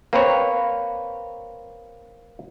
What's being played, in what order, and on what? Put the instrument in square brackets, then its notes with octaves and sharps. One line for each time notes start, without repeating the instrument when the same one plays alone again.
[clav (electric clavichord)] A#3 C4 A#4 B4 C#5